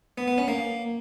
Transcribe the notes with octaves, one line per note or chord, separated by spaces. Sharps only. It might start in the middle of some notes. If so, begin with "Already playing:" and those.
B3
B3
C#4
A#3